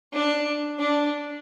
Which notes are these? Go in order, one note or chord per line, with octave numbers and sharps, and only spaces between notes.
D4
D4